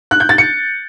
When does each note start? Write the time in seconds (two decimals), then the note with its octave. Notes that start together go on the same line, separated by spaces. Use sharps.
0.11 F#6
0.20 G6
0.29 A6
0.38 C#7